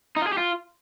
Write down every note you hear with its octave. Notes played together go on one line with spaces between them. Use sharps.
D#4
F4
G#4
G4
F4